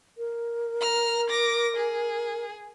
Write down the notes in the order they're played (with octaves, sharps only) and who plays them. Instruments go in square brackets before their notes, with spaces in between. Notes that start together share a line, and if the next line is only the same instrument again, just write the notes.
[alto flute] A#4
[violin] A#5 F6
D6 A#6
G#4